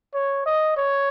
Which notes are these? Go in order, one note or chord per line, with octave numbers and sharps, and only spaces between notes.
C#5
D#5
C#5